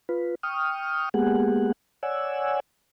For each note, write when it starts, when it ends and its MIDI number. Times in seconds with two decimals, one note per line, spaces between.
0.09 0.35 65
0.09 0.35 71
0.43 1.09 79
0.43 1.09 85
0.43 1.09 87
0.43 1.09 89
1.14 1.72 56
1.14 1.72 58
1.14 1.72 59
1.14 1.72 67
1.14 1.72 68
1.14 1.72 78
2.03 2.60 73
2.03 2.60 74
2.03 2.60 78
2.03 2.60 80
2.03 2.60 88